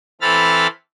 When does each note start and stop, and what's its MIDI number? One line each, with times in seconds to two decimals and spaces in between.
0.21 0.67 52
0.21 0.67 60
0.21 0.67 69
0.21 0.67 83
0.21 0.67 89
0.21 0.67 93